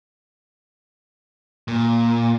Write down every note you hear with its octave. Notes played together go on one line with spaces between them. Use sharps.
A#2